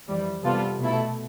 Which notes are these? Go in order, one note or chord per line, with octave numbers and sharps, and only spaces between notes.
F2 E3 G3
C3 G3 B3 F4 A4
B2 A3 E4 A4